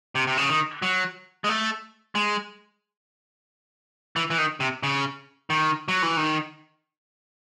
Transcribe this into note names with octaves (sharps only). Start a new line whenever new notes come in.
C3
C3
C#3
D#3
F#3
G#3
A3
G#3
E3
E3
D#3
C3
C#3
D#3
F#3
E3
D#3